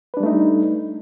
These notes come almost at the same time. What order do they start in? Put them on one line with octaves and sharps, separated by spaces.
B4 D4 G3 A3 D#4